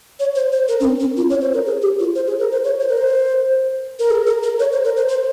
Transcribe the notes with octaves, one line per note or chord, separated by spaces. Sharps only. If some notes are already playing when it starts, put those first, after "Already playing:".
C#5
C5
C5
A#4
C#4
C4
C#4
F4
C#5
C5
A#4
G#4
G4
F4
C5
G#4
A#4
C5
C#5
C5
A#4
C5
A#4
G#4
A#4
A#4
C#5
C5
A#4
C5
C5